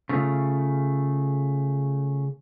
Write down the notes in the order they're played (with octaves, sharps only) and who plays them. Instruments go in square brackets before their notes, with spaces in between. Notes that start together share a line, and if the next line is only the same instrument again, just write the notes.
[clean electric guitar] C#3 A3 F4